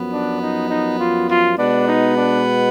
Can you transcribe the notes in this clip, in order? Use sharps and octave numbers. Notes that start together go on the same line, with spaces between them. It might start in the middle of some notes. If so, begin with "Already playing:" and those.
Already playing: F#2 F3 B3
D4
D#4
D#4
F4
F4
B2 G#3 B3 D4
D#4
D4